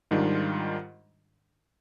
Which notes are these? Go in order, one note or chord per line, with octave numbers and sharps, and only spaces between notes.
G#2 D#3 G3 D4 F4